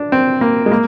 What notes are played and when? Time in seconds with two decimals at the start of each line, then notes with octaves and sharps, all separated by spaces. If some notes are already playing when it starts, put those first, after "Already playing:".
Already playing: D4
0.12 C4
0.41 A#3
0.66 G#3
0.71 A#3